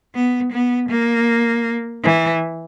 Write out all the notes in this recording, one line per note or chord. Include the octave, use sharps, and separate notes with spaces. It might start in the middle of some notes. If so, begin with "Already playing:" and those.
B3
B3
A#3
E3